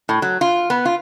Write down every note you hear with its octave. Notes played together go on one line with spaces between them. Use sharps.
A2
F#3
F4
B3
F4